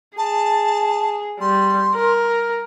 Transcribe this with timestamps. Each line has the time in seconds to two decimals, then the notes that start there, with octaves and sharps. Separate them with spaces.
0.18 G#4 A5
1.41 G3 C6
1.95 A#4